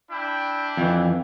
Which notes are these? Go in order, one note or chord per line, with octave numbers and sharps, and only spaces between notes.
D4 E4 G5
F2 E3